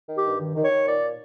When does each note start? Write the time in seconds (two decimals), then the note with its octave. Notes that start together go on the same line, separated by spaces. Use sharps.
0.08 D#3
0.16 G4
0.25 G2
0.40 D#3
0.56 D#3
0.63 C#5
0.71 D#3
0.87 A#2 D5